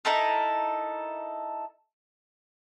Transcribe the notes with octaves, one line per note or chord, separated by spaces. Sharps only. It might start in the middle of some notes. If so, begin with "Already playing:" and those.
D#4 E4 A4 A#4